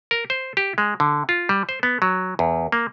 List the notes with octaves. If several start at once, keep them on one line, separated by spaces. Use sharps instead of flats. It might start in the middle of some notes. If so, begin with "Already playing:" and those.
A#4
C5
G4
G#3
D3
F4
G3
C5
B3
F#3
E2
A#3